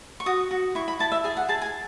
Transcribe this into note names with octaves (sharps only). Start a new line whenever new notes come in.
C#6
F#4 D#6
F#4
E4 C#6
B5
E4 A5
E5
G#4 G#5
F#5
G#4 A5
G#5